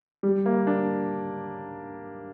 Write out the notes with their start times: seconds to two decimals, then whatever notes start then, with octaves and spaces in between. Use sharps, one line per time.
0.23 G3
0.46 A#3
0.67 D4